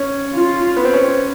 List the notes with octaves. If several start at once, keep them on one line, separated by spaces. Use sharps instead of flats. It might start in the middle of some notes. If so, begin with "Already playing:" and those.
Already playing: C#4
F4
B3
C4
C#4